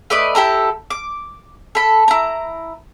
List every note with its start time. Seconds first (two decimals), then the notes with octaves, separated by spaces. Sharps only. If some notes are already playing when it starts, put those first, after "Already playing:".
0.10 A3 B4 D5 D#5
0.35 E4 G4 A4 A#5
0.90 D6
1.75 A4 B5
2.08 E4 A#5